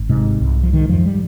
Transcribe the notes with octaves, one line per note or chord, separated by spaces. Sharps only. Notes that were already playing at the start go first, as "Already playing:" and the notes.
Already playing: G#1
G#2 C3 G#3
C2
F3
G#2 D#3
F2 F3
G3